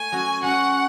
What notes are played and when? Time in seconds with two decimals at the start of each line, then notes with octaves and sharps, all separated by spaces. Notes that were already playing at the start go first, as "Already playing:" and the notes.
Already playing: A3 G#5
0.12 F#3 C#4 F#4
0.42 F#3 C#4 F#4 F#5